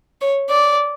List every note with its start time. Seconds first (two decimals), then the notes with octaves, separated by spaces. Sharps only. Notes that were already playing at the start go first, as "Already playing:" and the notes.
0.21 C#5
0.49 D5